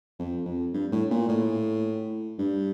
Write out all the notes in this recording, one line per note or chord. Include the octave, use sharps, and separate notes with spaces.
F2
F2
G2
A2
A#2
A2
G2